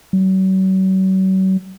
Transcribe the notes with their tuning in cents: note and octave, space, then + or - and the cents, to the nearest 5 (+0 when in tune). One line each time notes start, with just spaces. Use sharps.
F#3 +40